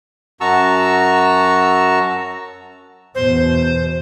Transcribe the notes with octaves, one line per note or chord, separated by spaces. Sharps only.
F#2 F#4 A5 A#5 C#6 E6
E2 B2 C5